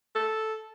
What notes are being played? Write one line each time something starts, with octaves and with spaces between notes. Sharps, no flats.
A4